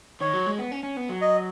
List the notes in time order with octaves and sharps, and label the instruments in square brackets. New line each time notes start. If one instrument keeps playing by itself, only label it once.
[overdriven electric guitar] D#3 [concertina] C#5
[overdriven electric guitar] F#3
G#3
B3
C#4
C#4
B3
F#3
[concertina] D#5